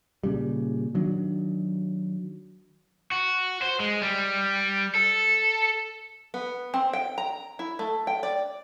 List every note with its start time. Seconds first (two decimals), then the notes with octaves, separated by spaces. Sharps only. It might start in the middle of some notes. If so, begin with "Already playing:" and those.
0.24 A#2 C#3 G3
0.95 D#3 F#3 D4
3.12 F#4
3.62 C5
3.80 G#3
4.02 G3
4.95 A4
6.34 B3
6.74 C4
6.93 G5
7.18 A#5
7.59 E4
7.79 A3
8.07 G5
8.23 D5